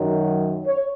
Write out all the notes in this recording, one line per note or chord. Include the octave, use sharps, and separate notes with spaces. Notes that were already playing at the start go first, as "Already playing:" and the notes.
Already playing: F#2 D#3 F#3
C#5